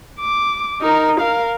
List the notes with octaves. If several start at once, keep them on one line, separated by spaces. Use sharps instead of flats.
D6
D#4 A#4
A#4 F5